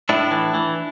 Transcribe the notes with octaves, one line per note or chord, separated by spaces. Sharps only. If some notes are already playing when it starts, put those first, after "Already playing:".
A2 D4 E4
E3
E3